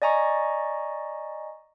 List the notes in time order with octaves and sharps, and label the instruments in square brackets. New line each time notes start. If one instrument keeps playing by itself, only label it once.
[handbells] D5 D#5 G#5 A#5 C#6